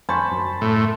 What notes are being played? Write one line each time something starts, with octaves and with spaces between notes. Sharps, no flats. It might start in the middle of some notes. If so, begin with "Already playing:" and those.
F2 C5 G#5 A5 B5 C#6
F#2
A2